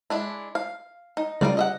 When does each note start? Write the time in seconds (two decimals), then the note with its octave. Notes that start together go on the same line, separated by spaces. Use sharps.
0.10 G#3 D4 E4
0.55 F5
1.17 D#4
1.41 C#3 G3 F4 A#4 D5
1.57 D#5 E5 F#5